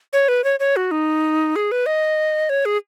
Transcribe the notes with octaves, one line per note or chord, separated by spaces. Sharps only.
C#5
B4
C#5
C#5
F#4
D#4
G#4
B4
D#5
C#5
G#4